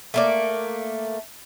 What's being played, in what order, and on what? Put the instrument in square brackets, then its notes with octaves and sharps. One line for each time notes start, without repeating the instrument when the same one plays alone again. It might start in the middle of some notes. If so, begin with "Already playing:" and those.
[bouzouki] A3 A#3 D5